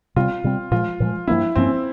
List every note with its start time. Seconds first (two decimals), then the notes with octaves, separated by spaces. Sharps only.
0.16 C3 G3 C4 F4
0.44 C3 G3 C4
0.71 A#2 F3 G#3 F4
1.00 A#2 F3 G#3
1.27 G2 F3 A#3 C#4 E4
1.56 G2 F3 A#3 C4 C#4